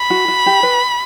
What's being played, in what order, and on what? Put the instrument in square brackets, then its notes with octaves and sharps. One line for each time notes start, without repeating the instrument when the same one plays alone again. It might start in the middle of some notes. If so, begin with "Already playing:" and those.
Already playing: [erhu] B5
[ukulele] F#4
F#4
G4
B4